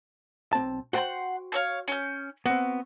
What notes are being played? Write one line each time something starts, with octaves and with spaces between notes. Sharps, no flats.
B1 C4 A5
F#4 C5 F#5 G5 A5 C6
A4 C#5 F5
C#4 G6
B3 C4 F#4